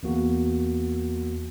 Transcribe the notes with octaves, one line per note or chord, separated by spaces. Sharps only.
E2 A#3 F#4